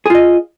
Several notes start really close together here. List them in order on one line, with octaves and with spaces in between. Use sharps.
G#4 F4 D#5